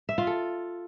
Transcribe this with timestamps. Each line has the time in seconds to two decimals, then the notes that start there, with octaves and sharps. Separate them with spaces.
0.09 E5
0.18 F4
0.27 A4